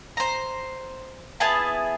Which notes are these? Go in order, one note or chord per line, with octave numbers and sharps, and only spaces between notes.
C5 A#5
B3 E4 G#4 A5